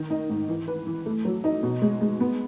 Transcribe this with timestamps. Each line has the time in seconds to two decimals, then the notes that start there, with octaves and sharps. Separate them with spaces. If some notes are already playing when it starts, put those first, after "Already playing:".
Already playing: D#3
0.10 D#4
0.29 G#2
0.49 E3
0.68 B4
0.87 E3
1.06 A3
1.25 F#3
1.44 D#4
1.63 B2
1.82 G#3
2.01 G#3
2.20 B3